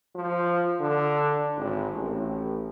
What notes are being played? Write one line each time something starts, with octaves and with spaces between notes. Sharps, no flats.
F3
D3
G#1
A1